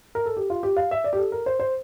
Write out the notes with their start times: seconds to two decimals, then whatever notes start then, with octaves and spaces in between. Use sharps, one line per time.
0.15 A#4
0.26 A4
0.37 G4
0.50 F4
0.63 G4
0.77 F5
0.91 E5
1.04 D5
1.13 G4
1.18 A4
1.32 A#4
1.46 C5
1.60 C5